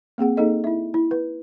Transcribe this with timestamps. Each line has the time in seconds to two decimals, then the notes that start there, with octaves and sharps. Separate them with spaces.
0.18 A#3 C4 G#4 F#5
0.37 A#3 D#4 G#4 A4 D#5
0.64 E4 E5
0.94 E4
1.11 B4